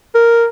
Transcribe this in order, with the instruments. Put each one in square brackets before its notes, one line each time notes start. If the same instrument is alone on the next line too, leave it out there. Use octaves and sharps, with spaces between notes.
[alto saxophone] A#4